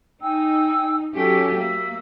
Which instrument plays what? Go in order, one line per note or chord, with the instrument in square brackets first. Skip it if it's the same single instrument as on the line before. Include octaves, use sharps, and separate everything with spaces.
[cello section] D#4 [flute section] G5 G#5 E6
[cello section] F#3 C#4 G4 [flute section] A4 E5 G#5
[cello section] A#3 [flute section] E5 E6